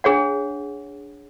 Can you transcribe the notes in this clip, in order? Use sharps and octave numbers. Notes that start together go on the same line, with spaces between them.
D4 G#4 C#5 F#5